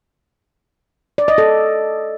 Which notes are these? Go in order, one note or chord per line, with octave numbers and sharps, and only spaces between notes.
D5
D#5
A4